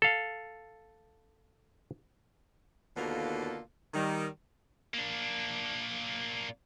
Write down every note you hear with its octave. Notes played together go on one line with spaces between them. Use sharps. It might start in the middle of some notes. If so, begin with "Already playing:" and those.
A4 F5
D#2 B2 D3 A#3 F4 A4
D#3 G3
A#3 D4